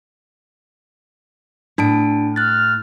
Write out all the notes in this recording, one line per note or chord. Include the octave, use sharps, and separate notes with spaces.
A2 D4 A5 D7
F6 F#6 A6